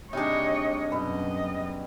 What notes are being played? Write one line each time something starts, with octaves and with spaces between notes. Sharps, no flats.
C3 G3 D4 D#4 G#4 C#5 D#5
F#2 B2 B4 D#5